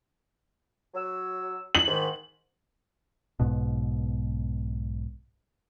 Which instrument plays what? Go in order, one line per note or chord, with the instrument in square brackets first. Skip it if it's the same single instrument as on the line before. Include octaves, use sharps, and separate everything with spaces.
[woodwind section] F#3 E6
[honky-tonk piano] F#7
[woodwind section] G#2 D#3
[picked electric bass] B1 G#2 B2